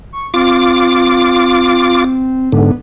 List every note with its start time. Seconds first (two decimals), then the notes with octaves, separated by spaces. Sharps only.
0.13 C#6
0.34 C4 F4 D6
2.52 G#2 D3 B3